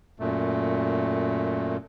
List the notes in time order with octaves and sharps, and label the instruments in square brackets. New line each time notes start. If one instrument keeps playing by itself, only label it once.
[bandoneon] F#2 A#2 A3